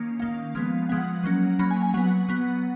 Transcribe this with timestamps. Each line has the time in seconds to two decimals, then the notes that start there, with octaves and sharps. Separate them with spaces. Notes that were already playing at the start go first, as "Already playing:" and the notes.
Already playing: D#3 A#3 C#4
0.19 D#3 A#3 C#4 F5
0.55 F3 G#3 B3
0.89 F3 G#3 B3 F#5
1.24 F#3 A#3 C#4
1.59 F#3 A#3 C#4 B5
1.71 G#5
1.82 G#5
1.94 F#3 B3 F#5
2.29 F#3 B3